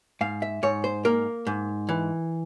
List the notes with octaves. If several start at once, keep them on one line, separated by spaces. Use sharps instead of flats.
G#2 F5
E5
G#2 C#5
C5
A#3 A#4
G#2
E3